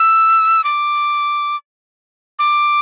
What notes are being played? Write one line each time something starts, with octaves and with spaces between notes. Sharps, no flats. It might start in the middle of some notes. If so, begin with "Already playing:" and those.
Already playing: E6
D6
D6